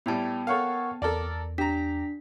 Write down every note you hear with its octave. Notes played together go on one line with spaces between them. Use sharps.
A2 G3 B3 G5 A5
A4 A#4 C#5 F5 F#5 C#6
E2 A4 A#4 D5
D4 G4 A#5 B6